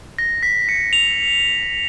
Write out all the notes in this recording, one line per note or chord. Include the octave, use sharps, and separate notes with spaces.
A#6
B6
C#7
F7